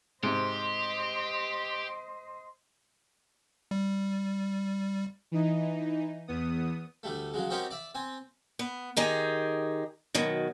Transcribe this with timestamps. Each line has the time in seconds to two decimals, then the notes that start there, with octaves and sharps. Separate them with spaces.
0.23 G#2 C3 G4 C5 D#5
3.71 G3
5.32 E3 D#4
6.28 E2 B3 D#6
7.03 D2 G3 A3
7.34 C#3 F#3 G#3
7.50 C4 C#4 D#4 F#4 G4 A#4
7.71 D5 E5
7.95 C4 G#5
8.59 B3
8.97 D#3 D#4 G4 G#4
10.15 B2 D#3 F#3